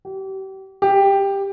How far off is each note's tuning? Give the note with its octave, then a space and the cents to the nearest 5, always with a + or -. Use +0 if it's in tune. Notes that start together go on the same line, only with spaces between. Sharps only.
G4 -35
G4 +10